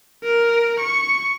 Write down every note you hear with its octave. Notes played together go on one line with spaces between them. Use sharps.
A#4
C#6